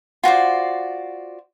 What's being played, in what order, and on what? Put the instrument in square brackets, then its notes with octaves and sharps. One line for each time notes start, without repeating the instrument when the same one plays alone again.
[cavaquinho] F4 F#4 C5 D5